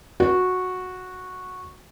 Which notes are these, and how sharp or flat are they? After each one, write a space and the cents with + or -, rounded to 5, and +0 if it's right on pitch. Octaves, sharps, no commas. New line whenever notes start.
F#4 -10